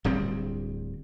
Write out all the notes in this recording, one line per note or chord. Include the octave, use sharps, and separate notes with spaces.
D1 D2 G3 C4